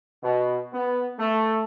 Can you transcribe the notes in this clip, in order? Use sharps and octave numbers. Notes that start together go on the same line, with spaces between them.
B2
B3
A3